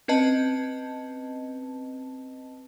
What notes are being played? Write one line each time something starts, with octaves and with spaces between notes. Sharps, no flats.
C4 C#4 B4 D#5 A5